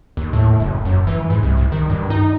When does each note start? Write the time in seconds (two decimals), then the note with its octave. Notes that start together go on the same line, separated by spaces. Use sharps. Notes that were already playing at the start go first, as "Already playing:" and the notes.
0.17 D#2
0.33 A2
0.60 F#1
0.85 F#2
1.07 E3
1.30 G#2
1.43 C2
1.57 C2
1.72 D#3
1.90 G2
2.10 D#4